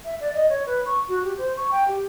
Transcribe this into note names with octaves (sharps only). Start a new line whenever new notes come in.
E5
D5
D#5
C#5
B4
C#6
F#4
G4
C5
C#6
G5
G4